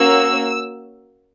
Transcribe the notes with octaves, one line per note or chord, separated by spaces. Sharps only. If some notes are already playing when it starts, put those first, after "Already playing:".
Already playing: A#3 C#4 F#4 E6